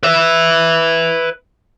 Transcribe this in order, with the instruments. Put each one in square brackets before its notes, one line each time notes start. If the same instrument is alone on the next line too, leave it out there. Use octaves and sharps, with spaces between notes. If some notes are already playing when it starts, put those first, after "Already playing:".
[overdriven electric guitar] B4 E5